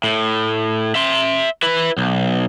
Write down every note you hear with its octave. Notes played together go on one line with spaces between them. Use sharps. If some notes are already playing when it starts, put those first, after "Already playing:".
A2
E5 C6
E4 B4
B1